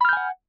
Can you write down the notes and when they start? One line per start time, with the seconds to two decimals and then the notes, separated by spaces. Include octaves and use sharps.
0.01 B5
0.05 F6
0.09 G6
0.13 G#5
0.17 F#5